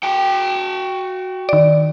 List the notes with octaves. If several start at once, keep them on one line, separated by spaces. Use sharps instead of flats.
F#4 G5
D#3 D5